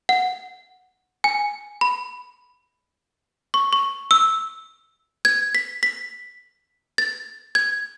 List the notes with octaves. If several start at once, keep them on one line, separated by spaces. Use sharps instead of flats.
F#5
G#5
B5
C#6
C#6
E6
G#6
B6
B6
A6
G#6